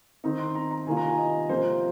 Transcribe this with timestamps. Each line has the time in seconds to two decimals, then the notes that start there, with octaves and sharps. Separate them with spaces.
0.24 D#3 C4 D#4 A#5
0.39 C6
0.55 A#5
0.71 A#5
0.87 C3 D#3 A#3 F4 G#5
0.97 A#5
1.08 G#5
1.18 D#5
1.49 C3 F3 A#3 C5